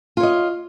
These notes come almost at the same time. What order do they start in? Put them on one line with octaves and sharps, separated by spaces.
F4 C#5 D#5